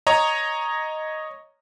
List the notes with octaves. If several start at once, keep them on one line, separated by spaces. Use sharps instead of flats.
C#5 D#5 A#5